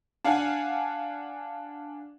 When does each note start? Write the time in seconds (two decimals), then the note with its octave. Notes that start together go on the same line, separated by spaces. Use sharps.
0.25 D4 F5 F#5 G#5